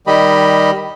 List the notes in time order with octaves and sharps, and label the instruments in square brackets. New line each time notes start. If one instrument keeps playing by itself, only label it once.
[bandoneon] D#3 G3 G4 D#5 B5